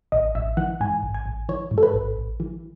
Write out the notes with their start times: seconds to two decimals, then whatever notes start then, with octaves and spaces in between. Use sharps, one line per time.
0.12 A1 D#5
0.35 A1 E5
0.57 E3 F#5
0.80 G#2 G#5
1.03 A1
1.14 G#5
1.26 A1
1.49 E3 C#5
1.71 G#2
1.78 A4
1.83 B4
1.94 A1
2.17 A1
2.40 E3